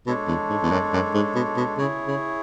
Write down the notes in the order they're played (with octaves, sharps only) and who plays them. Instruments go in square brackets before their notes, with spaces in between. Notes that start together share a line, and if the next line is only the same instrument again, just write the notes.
[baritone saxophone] B2 [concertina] G#3 D4 A4 C#5
[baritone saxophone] E2
G#2
E2
F#2
F#2
G#2
B2
B2
[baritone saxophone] C#3 [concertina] E4 G#4 C#5
[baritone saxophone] C#3